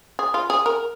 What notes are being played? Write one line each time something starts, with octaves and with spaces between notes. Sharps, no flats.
G#4
F4
G#4
A#4